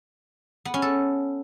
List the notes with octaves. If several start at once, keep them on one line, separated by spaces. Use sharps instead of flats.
B3
C#4
A4